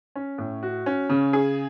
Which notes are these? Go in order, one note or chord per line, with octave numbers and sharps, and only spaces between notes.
C#4
A2
F#4
C#4
C#3
G#4